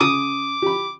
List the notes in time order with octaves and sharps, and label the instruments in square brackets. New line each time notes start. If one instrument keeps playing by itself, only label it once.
[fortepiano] C#3 [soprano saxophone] D6 [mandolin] D#6
[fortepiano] G4 B5